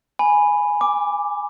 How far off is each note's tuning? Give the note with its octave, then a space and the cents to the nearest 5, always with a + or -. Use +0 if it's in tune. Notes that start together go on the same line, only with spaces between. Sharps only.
G#5 +0 B5 +0
G#5 -35 D6 +0